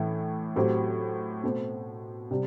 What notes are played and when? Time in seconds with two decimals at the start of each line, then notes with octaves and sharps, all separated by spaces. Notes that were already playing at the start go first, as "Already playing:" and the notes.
Already playing: A2 E3 A3 E4
0.56 A2 F#3 C4 G4
1.44 B2 A3 C4
2.31 C3 G3